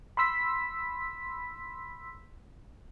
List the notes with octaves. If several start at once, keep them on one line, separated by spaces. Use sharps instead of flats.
B5 C6 E6 B6